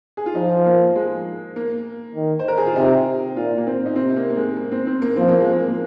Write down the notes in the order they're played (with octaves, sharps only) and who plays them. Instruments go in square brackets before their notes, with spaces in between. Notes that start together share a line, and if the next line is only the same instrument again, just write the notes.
[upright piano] G#4
F4
[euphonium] F3 [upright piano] D#4
[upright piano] A#3
G#3
A#3
[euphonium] D#3
[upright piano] C5
A#4
G#4
F4
[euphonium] C3 [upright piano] D#4
[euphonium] A#2 [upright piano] F4
[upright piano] A#3
C4
D#4
[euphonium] C3 [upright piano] C4
[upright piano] A#3
A#3
G#3
A#3
C4
C4
A#3
[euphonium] F3 [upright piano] C4
[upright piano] A#3
G#3
A#3
A#3